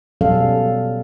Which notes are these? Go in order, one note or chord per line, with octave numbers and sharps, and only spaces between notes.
B2 F#3 G3 C#4 A4 F5